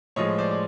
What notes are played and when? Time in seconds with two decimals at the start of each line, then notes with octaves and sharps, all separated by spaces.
0.16 A2 F3 G#3 C#5 D#5
0.38 C5 D5
0.51 D5